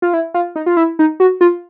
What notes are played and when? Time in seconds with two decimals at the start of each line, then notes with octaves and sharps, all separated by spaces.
0.02 F4
0.13 E4
0.34 F4
0.56 D#4
0.66 F4
0.77 E4
0.99 D#4
1.20 F#4
1.41 F4